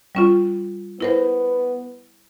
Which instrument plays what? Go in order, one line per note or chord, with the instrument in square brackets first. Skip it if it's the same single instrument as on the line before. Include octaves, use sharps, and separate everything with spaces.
[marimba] G3 C#4 F4
[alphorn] B3 [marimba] E4 A#4 C5